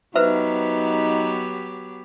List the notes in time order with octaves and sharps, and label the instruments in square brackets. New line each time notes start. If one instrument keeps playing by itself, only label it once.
[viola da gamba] F#3 B3 G4 [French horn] D#4 [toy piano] B4 C5 E5